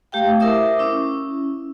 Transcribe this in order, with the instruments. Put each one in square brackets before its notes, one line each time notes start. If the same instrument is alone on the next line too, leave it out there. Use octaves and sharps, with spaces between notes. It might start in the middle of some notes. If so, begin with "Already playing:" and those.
[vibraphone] A3 G4 F5 G5
E4 A#4 C5 E5 D6 D#6
C#4 E4